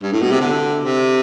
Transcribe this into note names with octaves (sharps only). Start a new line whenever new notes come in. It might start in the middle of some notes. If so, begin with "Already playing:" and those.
G2
A2
B2
C3
D3
C3